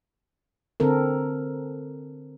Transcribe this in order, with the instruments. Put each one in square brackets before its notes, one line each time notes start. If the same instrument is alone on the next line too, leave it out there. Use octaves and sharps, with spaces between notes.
[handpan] D3 C4 A4 A#4